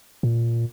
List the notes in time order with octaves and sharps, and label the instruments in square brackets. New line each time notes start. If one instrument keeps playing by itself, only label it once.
[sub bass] A#2